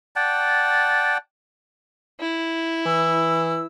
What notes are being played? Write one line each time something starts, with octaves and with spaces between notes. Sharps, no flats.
D5 F#5 G5 A5
E4
E3 E6